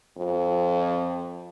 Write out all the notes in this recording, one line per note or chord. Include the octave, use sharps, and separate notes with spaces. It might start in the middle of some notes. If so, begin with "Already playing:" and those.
F2